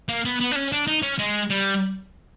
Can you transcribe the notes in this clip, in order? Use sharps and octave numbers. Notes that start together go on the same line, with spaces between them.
A#3
B3
B3
D4
C#4
D4
D#4
C#4
G#3
G3